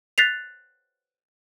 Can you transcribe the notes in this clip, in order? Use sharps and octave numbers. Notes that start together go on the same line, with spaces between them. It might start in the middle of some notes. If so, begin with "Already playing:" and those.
F#6 A6 B6 C7 F7